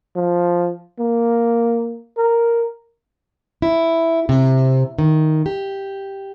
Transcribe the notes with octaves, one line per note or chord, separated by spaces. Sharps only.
F3
A#3
A#4
E4
C3
D#3
G4